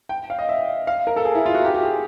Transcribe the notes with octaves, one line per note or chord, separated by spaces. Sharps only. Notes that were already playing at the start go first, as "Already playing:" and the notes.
G5
F5
D#5
E5
F5
A#4
A4
G#4
E4
F4
F#4
G4
G4
G#4